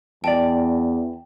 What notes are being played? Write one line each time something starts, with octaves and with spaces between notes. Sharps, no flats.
E2 D5 D#5 G5 A5